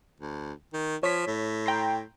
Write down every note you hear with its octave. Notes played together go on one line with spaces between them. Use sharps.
D2
D#3
F3 C#5 B6
A2
G5 A#5 C6